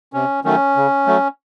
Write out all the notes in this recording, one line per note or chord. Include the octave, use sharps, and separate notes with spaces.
C3 C#4
D#3 F#3 A3 C#4
C#3
F#3 A3